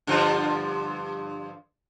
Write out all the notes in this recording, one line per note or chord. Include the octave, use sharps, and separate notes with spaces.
G2 D3 F3